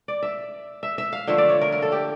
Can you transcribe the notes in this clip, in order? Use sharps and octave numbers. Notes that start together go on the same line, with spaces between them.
D5
E5
E5
E5
F5
D3 F3 A3 E5
D5
C#5
A#4
A#4
A4
G4